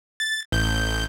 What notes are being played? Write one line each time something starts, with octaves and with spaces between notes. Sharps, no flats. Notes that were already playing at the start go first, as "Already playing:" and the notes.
A6
A1 G6